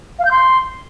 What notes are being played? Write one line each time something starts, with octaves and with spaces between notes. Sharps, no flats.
F5
G6
C6